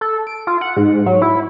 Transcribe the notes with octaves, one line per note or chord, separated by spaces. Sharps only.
A4
D7
F4
F#5
G#2
F#3
E4